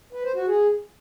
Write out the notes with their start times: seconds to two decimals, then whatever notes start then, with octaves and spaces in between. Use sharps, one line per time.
0.13 B4
0.24 C5
0.36 F#4
0.47 G#4